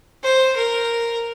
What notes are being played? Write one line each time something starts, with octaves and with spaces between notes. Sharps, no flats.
C5
A#4